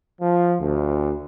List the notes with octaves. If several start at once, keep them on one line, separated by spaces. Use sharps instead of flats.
F3
D2